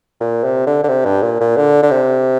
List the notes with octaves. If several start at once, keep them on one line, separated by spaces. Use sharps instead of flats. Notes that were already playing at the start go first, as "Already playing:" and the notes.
A#2
C3
D3
D3
C3
G2
A#2
A#2
D3
D3
C3